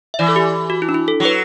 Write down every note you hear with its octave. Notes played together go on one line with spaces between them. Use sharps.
E5
E3 D5
A4
G4
F#4
E4
D4
E4
A4
F#3
B4